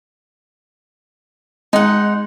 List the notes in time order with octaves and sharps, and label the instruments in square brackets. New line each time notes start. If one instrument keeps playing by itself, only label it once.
[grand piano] G#3 [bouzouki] D#4 F#5